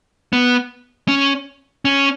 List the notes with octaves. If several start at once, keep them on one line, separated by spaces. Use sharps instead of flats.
B3
C#4
C#4